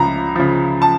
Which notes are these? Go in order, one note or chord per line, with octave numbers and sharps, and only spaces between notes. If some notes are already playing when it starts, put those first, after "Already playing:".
Already playing: C#2 C#3 F3 A#5
C#3 F3
A5